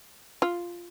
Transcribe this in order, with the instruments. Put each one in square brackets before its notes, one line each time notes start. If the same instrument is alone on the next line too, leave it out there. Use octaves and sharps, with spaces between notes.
[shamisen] F4